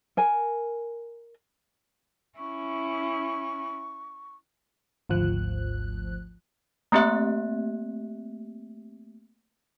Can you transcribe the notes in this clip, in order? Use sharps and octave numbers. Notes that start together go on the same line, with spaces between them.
A#4 G#5
C#4 E4 C#6
G#1 D2 F3 F#6
A3 A#3 C4 G4 E5 F#6